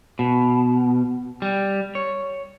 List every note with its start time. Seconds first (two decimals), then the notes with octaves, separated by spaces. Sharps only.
0.19 B2
1.42 G3
1.95 C#5